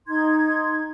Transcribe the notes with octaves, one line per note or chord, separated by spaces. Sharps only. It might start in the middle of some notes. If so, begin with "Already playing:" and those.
D#4 C6 G#6